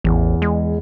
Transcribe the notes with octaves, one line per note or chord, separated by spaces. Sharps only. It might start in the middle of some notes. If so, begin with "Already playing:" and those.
A1 E2
G#3